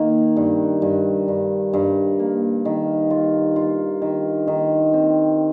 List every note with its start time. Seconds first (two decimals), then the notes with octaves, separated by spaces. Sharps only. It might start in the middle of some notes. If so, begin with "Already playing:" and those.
Already playing: D#3 A#3
0.36 G2
0.82 G2
1.28 G2
1.73 G2
2.19 A#3
2.65 D#3
3.10 F4
3.56 F4
4.02 D#3
4.48 D#3
4.94 C4